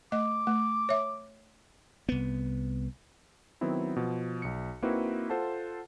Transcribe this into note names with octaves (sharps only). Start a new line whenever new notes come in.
A3 D#5 D6
A3
C#5 E5
C2 B3
D#3 F#3 B3 C4 E4
B2 F3
B1 C#7
A#3 C4 D#4 E4 F#4 B4
F4 A4 C5 F#5 A5